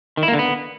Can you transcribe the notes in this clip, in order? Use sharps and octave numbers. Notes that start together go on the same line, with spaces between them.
D#3
E4
A#3
D3
B3